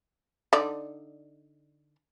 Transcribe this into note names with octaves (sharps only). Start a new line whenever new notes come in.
D3 D#4 D5